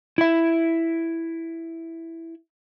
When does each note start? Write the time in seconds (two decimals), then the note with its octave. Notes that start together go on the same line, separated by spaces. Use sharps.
0.18 E4 E5